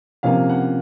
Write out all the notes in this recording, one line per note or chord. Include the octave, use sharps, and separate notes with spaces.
C3 F3 A#3 C#4 F5
F#5